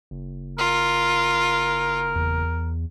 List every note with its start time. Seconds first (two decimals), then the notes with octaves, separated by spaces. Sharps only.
0.11 F#1
0.58 F4 A#4
2.15 E2